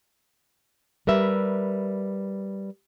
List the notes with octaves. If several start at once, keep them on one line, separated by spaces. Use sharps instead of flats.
G3 A#4 B4 E5